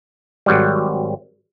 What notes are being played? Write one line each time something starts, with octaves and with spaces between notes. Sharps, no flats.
G#1 F#3 G3